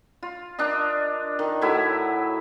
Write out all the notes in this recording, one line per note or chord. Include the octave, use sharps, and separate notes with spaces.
F4
D4 A#4 D#5
D#3
A2 F#3 E4 E5